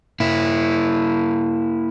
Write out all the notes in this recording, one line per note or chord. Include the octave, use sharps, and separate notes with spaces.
A#3 E4